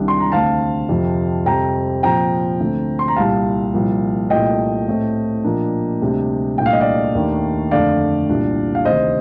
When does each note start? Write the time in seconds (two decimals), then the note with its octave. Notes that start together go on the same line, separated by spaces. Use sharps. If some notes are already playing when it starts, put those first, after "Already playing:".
Already playing: C2 C3 D#3 G3 D4
0.08 C6
0.20 A#5
0.32 D2 D3 A3 C4 F5 A5
0.89 F2 C3 F3 C4
1.46 F2 C3 G3 C4 G5 A#5
2.03 A#2 F3 C4 G5 A#5
2.60 D2 D3 A3 C4
2.99 C6
3.08 A#5
3.16 C2 A#2 G3 F5 A5
3.74 C2 A#2 F3 A#3
4.30 C2 A#2 A3 D#5 G5
4.88 A2 A3 C4
5.44 A#2 F3 A#3 D4
6.02 D2 C3 G3 D4
6.58 C2 A#2 A3 D4 G5
6.66 F5
6.73 D#5
6.81 D5 F5
7.15 D#2 D#3 A3 D4
7.71 F2 D3 A3 D4 D5 F5
8.29 C2 A#2 G3 D4
8.75 F5
8.85 D2 C3 D#3 C5 D#5